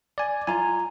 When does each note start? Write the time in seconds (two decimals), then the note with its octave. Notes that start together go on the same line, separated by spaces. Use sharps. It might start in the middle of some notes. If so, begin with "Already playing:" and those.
0.18 D5 G#5
0.47 F4 G#5 A#5